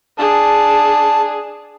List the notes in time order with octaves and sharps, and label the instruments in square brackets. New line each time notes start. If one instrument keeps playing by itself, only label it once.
[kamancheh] D4 G#4 [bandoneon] A5